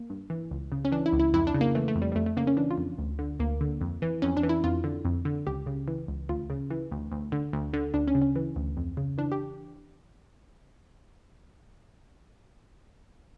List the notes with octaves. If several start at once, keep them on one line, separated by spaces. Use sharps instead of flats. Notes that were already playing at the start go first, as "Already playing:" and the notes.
Already playing: A#3
G2
E3
C#2
C#3
C#4
E3 D4
E4
C#2
E4
F2 E4
D4
C#3
A#3
E3 A3
A3
F2
G3
G3
F2 A3
A3
C#3 A#3
C#4
E3 D4
F4
F2
D2
D3
D2 A#3
D3
F2
E3
F2 C#4
D4
E3
E4
F2 F4
D3
F2
D3
C#2 G4
C#3
E3
C#2
D2 F4
C#3
E3
D2
D2
D3
D2
D3
D2 D4
C#4
C#3
C#4
E3
D2
F2
C#3
E3 D4
G4